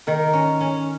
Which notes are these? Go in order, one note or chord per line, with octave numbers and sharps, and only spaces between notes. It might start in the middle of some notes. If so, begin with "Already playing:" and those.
D#3 A#4
C#4
C#4